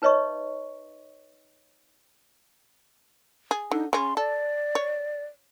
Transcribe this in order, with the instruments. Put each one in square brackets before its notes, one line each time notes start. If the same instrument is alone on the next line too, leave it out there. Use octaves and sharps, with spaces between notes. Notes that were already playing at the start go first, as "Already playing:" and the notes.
[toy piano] D#4 B4 C#5 D#5 E5 C#6
[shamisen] G#4
[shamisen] D3 [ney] D#4
[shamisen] C#3 C#4 [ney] C6
[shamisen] A4 [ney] D5
[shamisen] C#5